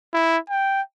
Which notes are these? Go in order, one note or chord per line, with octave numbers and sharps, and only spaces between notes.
E4
G5